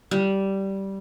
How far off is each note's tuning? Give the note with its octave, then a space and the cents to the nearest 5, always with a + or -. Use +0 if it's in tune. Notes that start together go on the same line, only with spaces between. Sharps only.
G3 -10